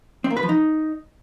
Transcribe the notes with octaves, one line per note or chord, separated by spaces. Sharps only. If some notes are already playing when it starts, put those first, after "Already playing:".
C4
A#3
B4
F3
D#4